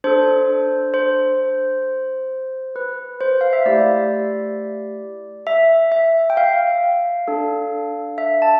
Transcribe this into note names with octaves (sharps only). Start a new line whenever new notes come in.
D4 A4 C5
C5
B4
C5
F5
E5
A3 E4 G4 D5
E5
E5
G5
F5
D4 A4
E5
A5